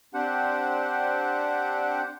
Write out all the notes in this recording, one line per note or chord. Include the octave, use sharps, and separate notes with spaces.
C4 D4 G4 C5 F#5